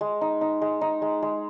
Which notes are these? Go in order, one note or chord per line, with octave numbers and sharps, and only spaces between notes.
G#3
D#4
D#4
G#3
D#4
G#3
G#3